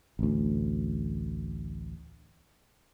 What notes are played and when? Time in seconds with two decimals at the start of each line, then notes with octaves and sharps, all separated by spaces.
0.19 A1 D2